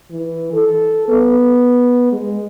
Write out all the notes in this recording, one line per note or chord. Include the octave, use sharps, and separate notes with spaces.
E3
A4
B3
G#3